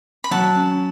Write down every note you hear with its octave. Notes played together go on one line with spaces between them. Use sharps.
B5
F#3 F#5 A5
C#4